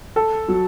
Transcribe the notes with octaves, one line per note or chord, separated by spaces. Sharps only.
A4
F#3